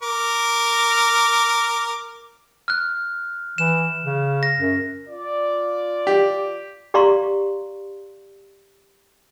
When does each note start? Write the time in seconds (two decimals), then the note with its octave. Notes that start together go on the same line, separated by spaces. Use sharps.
0.02 A#4 D6
2.68 F6 F#6
3.58 E3 E7
4.04 C#3
4.43 A#6
4.59 F#2
5.08 F4 D5
6.07 G4
6.94 G4 D5 F5 A#5 C6 C#6